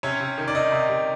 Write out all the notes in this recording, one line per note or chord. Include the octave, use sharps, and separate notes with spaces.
C3 C#4 C#5
C3
D#3
D5
C3 D#4 D#5
C3
C3